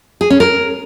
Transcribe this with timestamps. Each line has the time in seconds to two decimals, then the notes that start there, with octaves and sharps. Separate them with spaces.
0.21 G#4
0.30 C#4
0.40 A#4